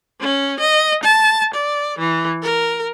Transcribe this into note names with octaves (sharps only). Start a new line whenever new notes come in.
C#4
D#5
A5
D5
E3
A#4